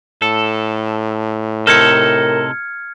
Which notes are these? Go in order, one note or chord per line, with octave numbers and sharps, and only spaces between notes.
A2 A4
C3 D#4 A4 A#4 F6 G#6 C#7